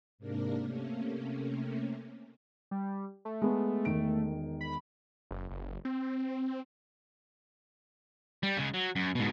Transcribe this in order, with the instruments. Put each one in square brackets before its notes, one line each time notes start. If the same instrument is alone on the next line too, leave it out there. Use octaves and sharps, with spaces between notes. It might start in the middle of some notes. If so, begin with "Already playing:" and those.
[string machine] G#2 C3 A#3 D4 A#4
C3 A3 A#3 C#4
[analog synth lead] G3
A3
[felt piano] G#3 B3
E1 D#3 D7
[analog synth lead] B5
[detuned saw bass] F#1
F#1
C4
[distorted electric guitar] G3
C#3 G#3
F#3
F#2
G#2 B2